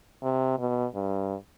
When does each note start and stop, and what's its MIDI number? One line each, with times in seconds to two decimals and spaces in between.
0.23 0.58 48
0.58 0.86 47
0.95 1.35 43